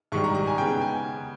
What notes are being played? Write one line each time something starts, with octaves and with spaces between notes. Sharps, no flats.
G#2 D#3 G3 C#6
A#5
A#5
G#5
C#3 G#3 B3 G5
G#5